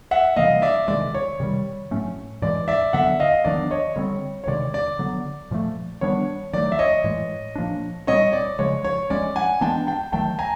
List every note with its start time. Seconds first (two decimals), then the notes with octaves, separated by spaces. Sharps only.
0.11 E5 F#5
0.36 C3 E3 G3 A#3 D#5 F5
0.62 D5 E5
0.88 C3 D#3 G#3 D5
1.14 C#5
1.40 C3 D#3 G3
1.91 A2 F#3 A3 C#4
2.42 A2 E3 G#3 D5
2.68 D5 E5
2.93 D3 F#3 B3 E5 F#5
3.20 D#5 F5
3.45 D#3 F#3 B3 D4 D5
3.71 C#5 D#5
3.96 D3 G3 C4 C#5
4.44 C#5
4.47 C3 D#3 G#3 D5
4.74 D5
4.99 D3 F#3 B3
5.51 A#2 F3 A3
6.01 D#3 G3 B3 D4 C#5
6.53 D#3 F#3 A3 D5
6.72 E5
6.79 C#5 D#5
7.04 A2 E3 G#3
7.55 A#2 F3 A#3 D4
8.07 A#2 G3 C4 C#5 D#5
8.33 D5
8.59 C#3 F3 G#3 C#5
8.84 C#5
9.10 F3 G#3 C#4 D5
9.36 F#5 G#5
9.61 E3 G#3 B3 D4 G5 A5
9.87 G5 A5
10.12 D#3 F#3 A3 G5 A5
10.39 G#5 A#5